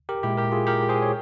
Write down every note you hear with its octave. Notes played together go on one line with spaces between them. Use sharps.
G4 A#4
A#2 G#3 E4 G4
G4 A#4
F4 G#4
G4 A#4
G#4 C5
C#5